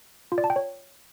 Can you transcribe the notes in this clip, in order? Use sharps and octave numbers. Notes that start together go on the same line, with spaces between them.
F4
D5
A5
G5
C#5